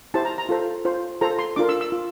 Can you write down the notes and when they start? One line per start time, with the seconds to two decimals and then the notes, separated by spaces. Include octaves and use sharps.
0.14 E4 G4 C5 A5
0.25 A#5
0.38 A#5
0.49 F4 A4 C5
0.85 F4 C5
1.21 F4 A4 C5 A#5
1.39 C6
1.56 D4 F4 A#4 D6
1.69 E6
1.81 E6
1.92 F4